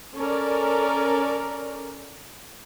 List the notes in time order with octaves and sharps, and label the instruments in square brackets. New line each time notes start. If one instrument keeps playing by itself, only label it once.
[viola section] C#4 A4 A#4 D5